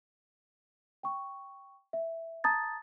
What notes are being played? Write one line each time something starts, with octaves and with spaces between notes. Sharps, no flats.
G5 C#6
E5
A5 A#5 D#6 G#6 A6